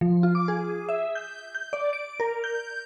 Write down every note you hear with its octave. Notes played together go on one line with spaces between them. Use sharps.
F3
F4
D6
G#4
E5
G6
G6
D5
D7
A#4
G6